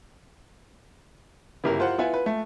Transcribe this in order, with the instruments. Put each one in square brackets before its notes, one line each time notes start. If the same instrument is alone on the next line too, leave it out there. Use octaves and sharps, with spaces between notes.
[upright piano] G1 C#3 [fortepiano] E4 G4 A#4
[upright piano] F4 C5 F#5
[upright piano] B3 E4 [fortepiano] F4 F#5 G#5
[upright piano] B4
A3